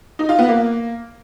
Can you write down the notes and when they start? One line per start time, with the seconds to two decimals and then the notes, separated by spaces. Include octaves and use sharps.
0.19 D#4
0.29 F4
0.39 B3
0.48 A#3